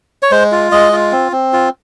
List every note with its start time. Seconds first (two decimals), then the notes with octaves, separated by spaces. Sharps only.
0.23 C#5
0.31 G#3 C5
0.52 F4
0.72 G#3 D#5
0.93 F4
1.12 C4
1.32 C4
1.53 F4